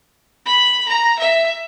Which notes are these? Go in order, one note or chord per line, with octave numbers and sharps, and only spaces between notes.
B5
A#5
E5